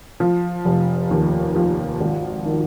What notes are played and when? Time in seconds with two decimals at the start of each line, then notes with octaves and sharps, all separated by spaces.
0.20 F3
0.65 F1
1.11 D#2
1.56 F3
2.01 G#1
2.45 D#3